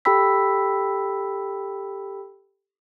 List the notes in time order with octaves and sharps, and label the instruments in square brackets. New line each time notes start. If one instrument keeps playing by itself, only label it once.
[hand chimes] G4 A4 G5 B5 E6 B6